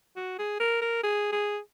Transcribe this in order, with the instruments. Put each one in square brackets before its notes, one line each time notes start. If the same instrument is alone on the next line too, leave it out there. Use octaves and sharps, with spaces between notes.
[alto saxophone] F#4
G#4
A#4
A#4
G#4
G#4